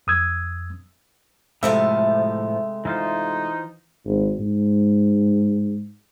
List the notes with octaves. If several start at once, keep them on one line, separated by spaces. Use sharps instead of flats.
F2 D#6 E6 G#6
A2 C3 F3 G#3 A3 E5
E3 D#4 F4 C5
G#1
G#2